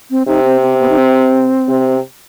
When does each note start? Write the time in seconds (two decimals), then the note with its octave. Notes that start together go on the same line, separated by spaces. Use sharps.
0.11 C4
0.27 C3 D#4
0.45 C4
0.62 C4
0.80 B3
0.90 D#4
0.98 C4
1.68 C3